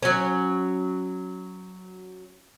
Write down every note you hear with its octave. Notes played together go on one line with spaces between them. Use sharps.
F#3 C#4